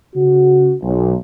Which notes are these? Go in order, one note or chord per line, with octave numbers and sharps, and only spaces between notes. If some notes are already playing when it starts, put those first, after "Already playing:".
C#3 F#4
B1